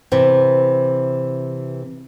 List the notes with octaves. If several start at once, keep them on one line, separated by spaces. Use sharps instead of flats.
C3 E3